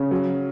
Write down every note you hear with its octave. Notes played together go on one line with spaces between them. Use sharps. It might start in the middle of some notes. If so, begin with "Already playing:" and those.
Already playing: C#3
F#3